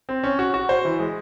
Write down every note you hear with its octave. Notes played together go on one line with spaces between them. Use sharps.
C4
C#4
F#4
F#4
C5
E3
G#3